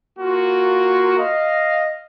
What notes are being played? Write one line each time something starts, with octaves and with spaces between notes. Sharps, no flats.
A#3 F4 F#4
D#5 F5